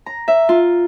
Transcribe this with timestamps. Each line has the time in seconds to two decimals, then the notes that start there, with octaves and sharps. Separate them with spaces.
0.06 A#5
0.28 E5
0.49 F4